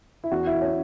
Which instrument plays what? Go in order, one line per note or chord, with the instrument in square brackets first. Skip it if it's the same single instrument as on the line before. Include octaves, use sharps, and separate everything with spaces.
[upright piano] E4
E2 F#4
E4
E2
C#4